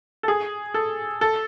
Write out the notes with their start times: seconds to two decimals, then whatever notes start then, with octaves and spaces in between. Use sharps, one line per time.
0.23 A4
0.28 G#4
0.74 A4
1.21 A4